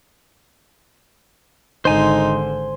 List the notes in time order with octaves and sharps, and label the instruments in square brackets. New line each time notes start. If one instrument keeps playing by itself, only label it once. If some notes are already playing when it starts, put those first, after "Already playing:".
[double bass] G#1 D3 [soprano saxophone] D#4 [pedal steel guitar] C5 G#5 C6